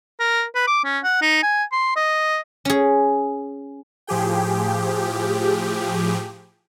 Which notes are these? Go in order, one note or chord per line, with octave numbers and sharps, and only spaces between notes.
A#4
B4
D6
C#4
F#5
D#4
G#5
C6
D#5
C#4 G#4
A2 F3 G4 G#4 G5